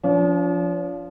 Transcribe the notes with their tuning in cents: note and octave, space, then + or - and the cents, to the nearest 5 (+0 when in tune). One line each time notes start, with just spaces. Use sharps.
F3 +0 D4 -45